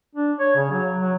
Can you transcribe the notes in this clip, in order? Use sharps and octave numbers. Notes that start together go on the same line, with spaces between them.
D4
C#5
C#3
F#3
F#3